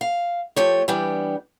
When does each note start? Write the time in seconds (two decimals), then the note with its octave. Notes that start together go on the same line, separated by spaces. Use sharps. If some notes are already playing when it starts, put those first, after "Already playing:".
0.01 F5
0.56 F3 A3 G4 C#5
0.88 E3 G3 B3 D4 G4